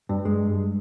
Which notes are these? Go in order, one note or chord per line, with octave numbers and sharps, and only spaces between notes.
G2
G#3